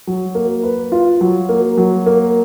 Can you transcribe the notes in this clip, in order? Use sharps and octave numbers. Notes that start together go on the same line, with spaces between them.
F#3
A#3
B4
F4
F#3
A#3
F#3
A#3